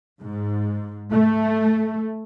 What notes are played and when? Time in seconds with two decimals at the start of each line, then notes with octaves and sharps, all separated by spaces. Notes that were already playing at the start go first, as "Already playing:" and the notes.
0.20 G#2
1.11 A3